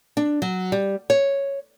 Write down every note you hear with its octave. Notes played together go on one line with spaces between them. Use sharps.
D4
F#3
G3
C#5